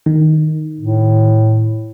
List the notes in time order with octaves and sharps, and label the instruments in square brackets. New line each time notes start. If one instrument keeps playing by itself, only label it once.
[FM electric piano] D#3
[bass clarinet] A2